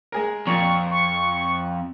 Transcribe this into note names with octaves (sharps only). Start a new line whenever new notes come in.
G#3 G#4 A#4
F2 A#2 C#6
C#6